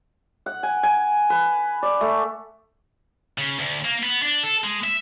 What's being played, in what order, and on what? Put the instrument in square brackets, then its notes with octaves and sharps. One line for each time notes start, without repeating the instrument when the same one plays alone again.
[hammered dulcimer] F#5
G#5
G#5
B4
D5
A3
[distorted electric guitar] C#3
D2
A#3
B3
D4
A4
G#3
E5